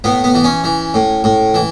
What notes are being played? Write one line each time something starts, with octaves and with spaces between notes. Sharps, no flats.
A2 B3
B3
E3
C#4
E3
A2
A2
E3